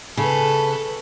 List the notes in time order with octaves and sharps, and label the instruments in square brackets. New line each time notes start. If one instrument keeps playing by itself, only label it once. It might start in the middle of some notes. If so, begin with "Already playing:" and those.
[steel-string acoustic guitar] C#3 [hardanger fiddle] A4 B4